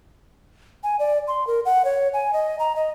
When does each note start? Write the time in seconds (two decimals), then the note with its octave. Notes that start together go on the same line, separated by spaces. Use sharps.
0.84 G#5
0.99 D5
1.28 C6
1.47 A#4
1.65 F#5
1.85 C#5
2.14 G#5
2.33 D#5
2.59 A#5
2.76 D#5